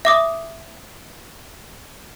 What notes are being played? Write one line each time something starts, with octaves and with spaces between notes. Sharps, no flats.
E5 D6 D#6